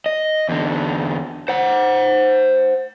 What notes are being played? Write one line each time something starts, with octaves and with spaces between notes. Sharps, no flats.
D#5
E2 D3
C5 F#5